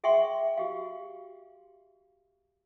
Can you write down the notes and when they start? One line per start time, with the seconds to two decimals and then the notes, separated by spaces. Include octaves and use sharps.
0.04 G#4 E5 F#5 G5 C6 C#6
0.57 F#4 G4 F5